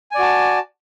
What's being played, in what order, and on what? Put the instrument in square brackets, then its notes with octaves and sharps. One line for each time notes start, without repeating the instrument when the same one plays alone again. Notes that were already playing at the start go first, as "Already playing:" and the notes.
[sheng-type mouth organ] G#5
D5
F#4
A5